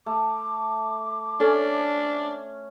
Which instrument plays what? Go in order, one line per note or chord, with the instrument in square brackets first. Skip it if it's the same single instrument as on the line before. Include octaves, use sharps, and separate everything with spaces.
[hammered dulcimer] A3 [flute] D6
[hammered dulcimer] C#4 [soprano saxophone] D4 [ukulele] A4